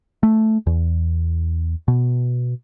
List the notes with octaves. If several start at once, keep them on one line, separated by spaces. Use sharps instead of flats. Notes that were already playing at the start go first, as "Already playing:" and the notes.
A3
E2
B2